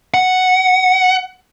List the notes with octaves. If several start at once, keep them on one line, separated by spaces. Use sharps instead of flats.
F#5